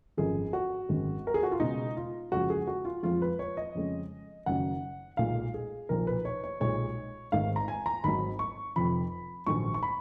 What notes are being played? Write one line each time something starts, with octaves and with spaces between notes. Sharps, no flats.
G#1 F#2 F3 G#4
F#4
G#1 F#2 D#3 G#3
A#4
G#4
F#4
F4
C#2 B2 G#3 D#4
F4
F#1 F#2 F3 G#3 F#4
G#4
F#4
F4
F2 F3 G#3 F4
B4
C#5
D#5
F2 C#3 G#3
F#1 F#2 D#3 F#3 F#5
B1 A#2 G#3 F5
G#4
B1 A#2 F3 A#4
B4
C#5
C#5
B1 A#2 G#3 C#5
G#1 G#2 D#3 G#3 F5
A#5
G#5
A#5
G#1 G#2 F#3 B5
C#6
F1 F2 F3 B5
A#1 G#2 D#3 F#3 C#6
C#6
B5